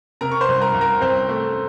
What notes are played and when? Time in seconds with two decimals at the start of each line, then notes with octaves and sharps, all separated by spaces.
0.21 C3 A#4 A#5
0.32 C#6
0.41 C5 C6
0.48 C2
0.61 A#4 A#5
0.74 C2
0.81 A#4 A#5
1.01 C2 C4 C5
1.29 A3